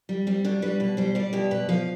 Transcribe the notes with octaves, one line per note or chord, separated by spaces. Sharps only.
G3
G3 C4
B2 D4
G3 B4
B2 B4
G3 C5
G3 D5
B2 G4
B2 B4
F3 F5